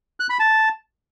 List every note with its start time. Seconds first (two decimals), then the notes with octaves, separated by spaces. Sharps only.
0.20 F#6
0.30 B5
0.40 A5